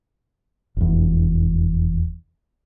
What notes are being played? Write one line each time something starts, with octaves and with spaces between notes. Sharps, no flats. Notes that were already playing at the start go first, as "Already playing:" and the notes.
F1 E2